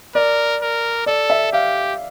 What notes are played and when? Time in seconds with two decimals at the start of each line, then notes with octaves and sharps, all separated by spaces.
0.15 A#4 D5
0.62 A#4
1.06 A4 D5
1.30 E5
1.53 G4 F5